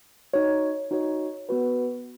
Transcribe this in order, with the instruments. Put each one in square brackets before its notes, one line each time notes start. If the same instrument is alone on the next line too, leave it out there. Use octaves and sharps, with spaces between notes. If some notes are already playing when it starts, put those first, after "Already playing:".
[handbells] D#4 F#4 C#5
D#4 F#4 C#5
B3 F#4 B4